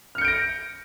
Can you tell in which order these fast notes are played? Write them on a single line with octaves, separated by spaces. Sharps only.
F6 C#7 G6 D7 A#6